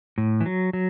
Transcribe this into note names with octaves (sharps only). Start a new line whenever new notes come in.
A2
E3
F#3
F#3